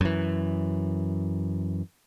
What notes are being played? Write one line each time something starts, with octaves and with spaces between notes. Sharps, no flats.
F#2 E3